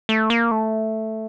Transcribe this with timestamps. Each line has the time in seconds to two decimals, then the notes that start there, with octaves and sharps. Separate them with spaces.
0.09 A3
0.30 A#3
0.51 A3